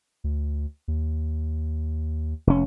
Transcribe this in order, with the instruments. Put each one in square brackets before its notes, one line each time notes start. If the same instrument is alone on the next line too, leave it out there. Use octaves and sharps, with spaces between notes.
[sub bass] D2
D#2
[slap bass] F1 C#4